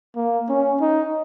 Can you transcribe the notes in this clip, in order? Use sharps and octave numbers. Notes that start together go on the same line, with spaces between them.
A#3
C#4
D#4